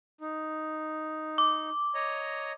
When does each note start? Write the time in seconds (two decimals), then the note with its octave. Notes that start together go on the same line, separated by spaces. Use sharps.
0.21 D#4
1.38 D6
1.95 C#5 D#5 A#5